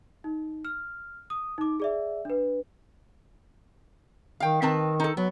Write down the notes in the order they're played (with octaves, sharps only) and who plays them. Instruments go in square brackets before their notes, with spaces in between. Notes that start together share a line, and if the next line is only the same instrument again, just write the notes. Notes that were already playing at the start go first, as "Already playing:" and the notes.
[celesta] D#4
F6
D#6
D#4 D6
G#4 D5 E5
D4 B4
[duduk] D#3 [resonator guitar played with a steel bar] F5 G5
[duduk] D#3 [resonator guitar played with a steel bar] C4 B4 A5
[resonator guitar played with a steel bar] D#4 A4
[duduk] F#3 [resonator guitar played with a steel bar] B3